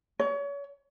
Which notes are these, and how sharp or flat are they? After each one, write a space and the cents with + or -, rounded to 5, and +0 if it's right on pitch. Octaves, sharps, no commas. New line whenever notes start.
C#5 +35